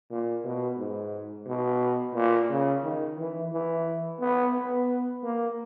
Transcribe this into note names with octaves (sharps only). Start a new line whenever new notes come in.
A#2
B2
G#2
B2
A#2
C#3
D#3
E3
E3
B3
B3
A#3